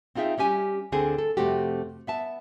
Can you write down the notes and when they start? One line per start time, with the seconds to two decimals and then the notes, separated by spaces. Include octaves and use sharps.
0.15 C4 D#4 F4 G#4 E5 G5
0.38 G3 C#4 G4 G#5
0.92 D2 D3 C4 G#4 A4 C5
1.18 A4
1.37 F2 C3 A3 C4 F#4 G4
2.07 B3 E5 A5